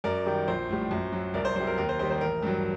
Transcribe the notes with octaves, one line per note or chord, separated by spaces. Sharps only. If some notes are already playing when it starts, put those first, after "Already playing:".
F#2 A#4 D5
D#3 G3
A#1 C5
A2 G3
F#2
F#3
C2 A#4 D5
C5
C3 F#3 C5
A#4
D#2 A#4
C5
D#3 G3 C5
C5
A1 A#4
G2 F#3